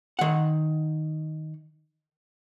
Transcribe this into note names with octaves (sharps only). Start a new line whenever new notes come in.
D#3 F#5